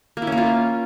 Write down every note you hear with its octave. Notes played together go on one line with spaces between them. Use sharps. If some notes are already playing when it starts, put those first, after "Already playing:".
A#3
E4
C#4
A#3
F4